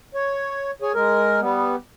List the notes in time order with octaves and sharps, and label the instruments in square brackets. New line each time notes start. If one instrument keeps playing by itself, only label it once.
[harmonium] C#5
G#4 C#5
G#3 A#4
G3 B3